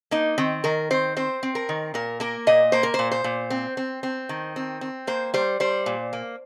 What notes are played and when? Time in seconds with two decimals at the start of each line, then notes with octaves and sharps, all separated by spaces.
0.11 A#3 D#4
0.38 D#3 C4
0.64 D#3 A#4
0.91 C4 C5
1.17 C4 C5
1.43 C4
1.55 A#4
1.69 D#3
1.94 A#2 A#4
2.20 A#3 A#4
2.47 A#2 D#5
2.72 A#3 C5
2.83 A#4
2.94 A#2 C5
3.11 C5
3.24 A#2
3.50 C4
3.77 C4
4.03 C4
4.29 D#3
4.56 C4
4.81 C4
5.07 A#3 C5
5.34 G3 C5
5.60 G3 C5
5.86 A#2
6.13 A#3